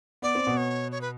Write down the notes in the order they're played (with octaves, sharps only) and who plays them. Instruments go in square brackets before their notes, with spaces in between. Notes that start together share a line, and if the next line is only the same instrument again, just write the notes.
[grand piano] B3 [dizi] D5
[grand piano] C4
B2 B3
[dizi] C#5
C#5
B4